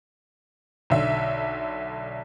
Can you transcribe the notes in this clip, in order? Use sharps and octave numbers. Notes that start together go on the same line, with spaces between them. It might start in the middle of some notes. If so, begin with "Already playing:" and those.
B1 D3 E5